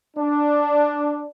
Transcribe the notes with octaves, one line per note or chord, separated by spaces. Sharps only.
D4